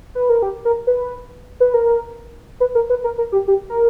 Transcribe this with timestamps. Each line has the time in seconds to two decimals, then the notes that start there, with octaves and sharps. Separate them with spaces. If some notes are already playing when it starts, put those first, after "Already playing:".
0.15 B4
0.29 A#4
0.42 G4
0.65 A#4
0.87 B4
1.60 B4
1.74 A#4
2.60 B4
2.75 A#4
2.90 B4
3.04 A#4
3.18 A#4
3.32 G4
3.48 G4
3.70 A#4